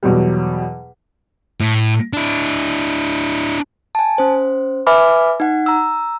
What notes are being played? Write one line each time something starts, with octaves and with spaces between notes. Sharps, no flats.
E2 B2 F#3 G3
A2
D4 E4
G#5 A5
C#4 C5
B4 E5 G#5 B5 D6 F6
D#4 F#5
A#5 E6